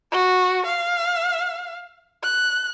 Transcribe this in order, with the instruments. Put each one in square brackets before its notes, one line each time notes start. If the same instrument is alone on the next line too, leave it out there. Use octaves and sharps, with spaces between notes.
[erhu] F#4
F5
F#6